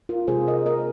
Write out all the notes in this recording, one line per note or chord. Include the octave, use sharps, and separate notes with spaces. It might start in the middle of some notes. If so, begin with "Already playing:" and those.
F4 A#4
C3 G#3 C4 D#4 G#4 C5
A#4 D#5
A#4 D#5